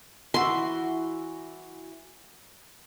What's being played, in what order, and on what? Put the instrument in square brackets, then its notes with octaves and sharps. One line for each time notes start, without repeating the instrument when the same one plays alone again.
[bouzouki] E3 E4 F#4 [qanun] C6